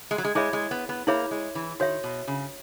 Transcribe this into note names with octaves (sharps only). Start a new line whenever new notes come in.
G#3
F#3
G#3
G#3 E4 G#4 C#5 E5 B5
G#3
B3
B3
A#3 E4 G#4 C#5 E5 B5
G#3
E3
D#3 F#4 C#5 E5
B2
C#3